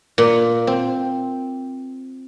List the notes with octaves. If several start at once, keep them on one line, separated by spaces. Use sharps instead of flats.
A#2
C4